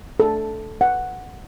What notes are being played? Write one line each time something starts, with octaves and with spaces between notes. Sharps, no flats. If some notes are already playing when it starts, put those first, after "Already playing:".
A4
F#5